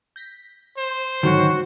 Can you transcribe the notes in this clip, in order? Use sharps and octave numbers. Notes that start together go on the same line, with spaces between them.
G6 A#6 B6
C5
G#2 D3 D#3 F#3 C#4 F#4